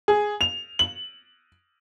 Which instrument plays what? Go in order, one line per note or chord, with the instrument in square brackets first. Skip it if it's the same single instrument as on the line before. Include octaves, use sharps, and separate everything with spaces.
[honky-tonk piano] G#4
F7
F#7